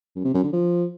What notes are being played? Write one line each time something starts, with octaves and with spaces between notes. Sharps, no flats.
F#2
C3
F#2
D3
F3